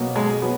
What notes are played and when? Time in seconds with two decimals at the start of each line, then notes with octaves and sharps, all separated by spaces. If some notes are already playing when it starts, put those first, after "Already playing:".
Already playing: B2 F#3 A#3
0.16 G#3
0.42 F#3 B3